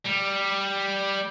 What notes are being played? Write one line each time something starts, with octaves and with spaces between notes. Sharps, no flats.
G3